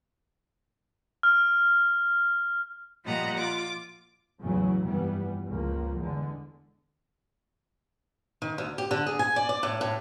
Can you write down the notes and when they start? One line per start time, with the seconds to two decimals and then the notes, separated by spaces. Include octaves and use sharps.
1.23 F6
3.03 A#2 F3 G3 D#5 F#5 A#5
3.36 F4 D6
4.40 E2 A2 C#3 E3 F#3
4.85 F1 G2 E3 G3 B3
5.49 C#2 F3 A#3
5.99 E2 D3 G#3
8.42 D#3
8.58 D2
8.78 G4
8.91 D3
9.06 G#4
9.19 G#5
9.36 D5
9.49 D5
9.63 A2
9.81 A2